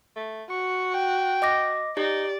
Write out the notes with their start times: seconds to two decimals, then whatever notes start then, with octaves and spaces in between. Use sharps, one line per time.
0.16 A3
0.50 F#4 C#6
0.94 G5
1.42 D#5 D6 A#6
1.97 D#4 G4 D5